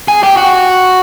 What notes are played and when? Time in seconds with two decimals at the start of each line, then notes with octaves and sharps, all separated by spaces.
0.08 G#4
0.23 G4
0.37 F#4